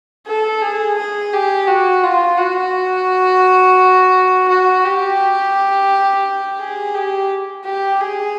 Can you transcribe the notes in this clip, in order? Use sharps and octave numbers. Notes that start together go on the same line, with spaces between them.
A4
G#4
G#4
G4
F#4
F4
F#4
F#4
G4
G#4
G4
G4
G#4